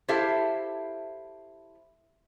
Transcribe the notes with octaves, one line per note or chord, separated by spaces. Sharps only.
E4 G4 A4 C5 E5 F5